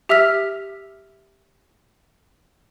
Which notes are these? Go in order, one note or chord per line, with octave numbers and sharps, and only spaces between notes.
G4 E5 E6 F6 B6